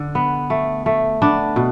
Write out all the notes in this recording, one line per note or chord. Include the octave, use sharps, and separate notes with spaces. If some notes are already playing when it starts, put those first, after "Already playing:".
Already playing: D3
B3
A3
A3
B3 D4
B2